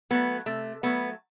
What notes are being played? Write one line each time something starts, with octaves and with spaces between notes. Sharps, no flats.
F#3 A3 B3
C3 A3
F#3 A3 B3